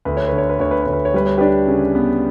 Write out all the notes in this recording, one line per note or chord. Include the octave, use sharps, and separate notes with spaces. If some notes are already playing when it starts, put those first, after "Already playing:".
D2 B4
C#5
D3 B4
C#5
B4
D2 C#5
B4
D2 C#5
B4
C#5
G3 B4
C#5
D4 G4 B4
C#3
B3